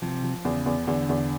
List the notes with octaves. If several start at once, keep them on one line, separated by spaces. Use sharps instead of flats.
C3 F3
F3
E2 C#3
E2
E2 D3
E2